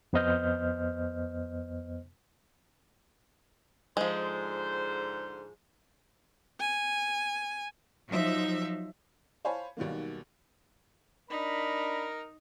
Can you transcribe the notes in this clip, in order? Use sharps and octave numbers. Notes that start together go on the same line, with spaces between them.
F2 B3 C5 D#5 F6 G6
G#2 D3 F3 G#3 C5
G#5
F3 F#3 D#4 E5
C5 C#5 F5 G#5 A5 B5
B1 B2 D#3 G3 A#3
D4 D#4 A#4 B5